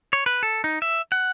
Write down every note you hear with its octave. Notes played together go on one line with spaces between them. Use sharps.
C#5
B4
A4
D#4
E5
F#5